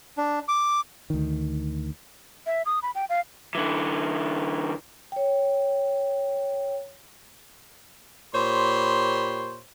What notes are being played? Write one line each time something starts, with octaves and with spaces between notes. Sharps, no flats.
D4
D6
D2 D#3
E5
D#6
B5
G5
F5
D3 E3
C#5 G5
A#2 G4 C5 C#5 B5 C6